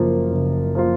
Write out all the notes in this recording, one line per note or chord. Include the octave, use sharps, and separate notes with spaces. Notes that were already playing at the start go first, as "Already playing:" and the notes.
Already playing: F#1 F#2 F3 A#3 F4
F#1
F3 A#3 F4